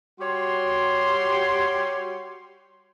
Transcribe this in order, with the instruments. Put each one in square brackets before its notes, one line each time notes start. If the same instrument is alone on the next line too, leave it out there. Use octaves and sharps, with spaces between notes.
[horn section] G3 F#4 G4 C#5 C6